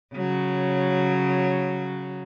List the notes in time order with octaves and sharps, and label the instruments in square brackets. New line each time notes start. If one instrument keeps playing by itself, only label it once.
[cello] C#3 F#3